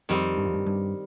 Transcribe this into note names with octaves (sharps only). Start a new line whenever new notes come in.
F2 D#3 G3 C4
G2
F2
G2
G2